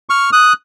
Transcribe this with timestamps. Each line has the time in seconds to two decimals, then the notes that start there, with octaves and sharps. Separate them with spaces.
0.09 C#6 F6
0.32 D#6 F#6